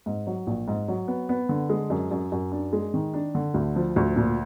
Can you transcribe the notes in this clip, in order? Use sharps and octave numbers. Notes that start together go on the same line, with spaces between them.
G#2
F#3
A#1
G#2
F#3
B3
B3
D3
G#3
F#2
F#2
F#2
D4
G#3
D#3
D4
D3
D2
F3
D2
A#2